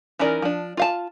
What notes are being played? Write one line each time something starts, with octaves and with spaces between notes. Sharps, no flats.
E3 C#4 D#4 A#4 D5
F3 D4
F4 F5 A5